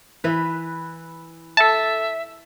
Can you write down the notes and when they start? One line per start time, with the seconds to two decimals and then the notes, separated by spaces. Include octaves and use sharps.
0.24 E3 B4
1.57 A4 E5 A5